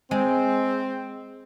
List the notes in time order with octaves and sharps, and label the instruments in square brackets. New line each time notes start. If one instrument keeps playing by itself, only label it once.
[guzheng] G#3 [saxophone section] C4